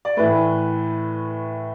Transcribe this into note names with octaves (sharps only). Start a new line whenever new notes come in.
D5
A2 E3 A3 B4